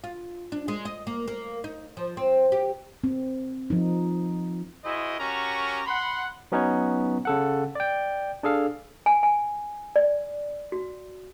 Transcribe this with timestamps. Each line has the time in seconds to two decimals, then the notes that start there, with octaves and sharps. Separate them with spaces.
0.04 F4
0.52 D4
0.68 G#3
0.85 D#5
1.07 A#3
1.28 A#3
1.64 D#4
1.97 F3
2.17 C4
2.52 G4
3.04 C4
3.70 F3 D#4
4.84 E4 F#4 G#4 C5 D#5
5.18 C#4 F#4 G4 A#4 A#5 C#6
5.86 F#5 B5 C6
6.52 F#3 B3 C#4 D#4 B4 C#5
7.25 C#3 A4 F#5
7.75 D5 G5
8.43 D4 G#4 A4 F5
9.06 G#5
9.23 G#5
9.96 D5
10.72 F#4